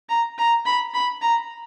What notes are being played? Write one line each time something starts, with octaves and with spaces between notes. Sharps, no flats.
A#5
A#5
B5
B5
A#5